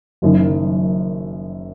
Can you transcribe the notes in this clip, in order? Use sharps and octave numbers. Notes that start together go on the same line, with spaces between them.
F#1 F#2 D#3